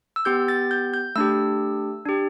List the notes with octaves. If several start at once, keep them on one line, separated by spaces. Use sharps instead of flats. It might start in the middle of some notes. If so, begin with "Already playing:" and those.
E6
B3 G4 G6
A6
G6
G6
A3 D4 G4 E6
D4 G4